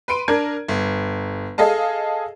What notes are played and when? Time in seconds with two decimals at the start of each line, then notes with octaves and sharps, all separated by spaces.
0.08 B4 C6 D7 D#7
0.28 D4 A#4 G#6
0.68 G1
1.58 G#4 A4 D#5 F5 A5